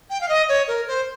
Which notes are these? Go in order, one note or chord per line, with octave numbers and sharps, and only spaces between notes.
G5
F5
D#5
C#5
A#4
C5